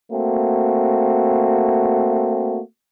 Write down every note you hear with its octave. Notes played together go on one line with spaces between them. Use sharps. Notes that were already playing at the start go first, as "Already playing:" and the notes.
A3 A#3 C4 F#4